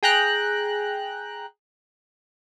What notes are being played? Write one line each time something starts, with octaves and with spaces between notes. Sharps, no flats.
G#4 G5 A#5 F#6